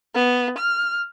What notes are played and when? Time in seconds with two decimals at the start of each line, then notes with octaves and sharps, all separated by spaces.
0.15 B3
0.58 F6